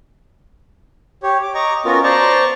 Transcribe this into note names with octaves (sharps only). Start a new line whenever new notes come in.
G4 C#5
D6
D#5 A#5 C#6 D6
B3 C#4 F4 F#4 A#4
C5 D5 A5 A#5 C#6 D6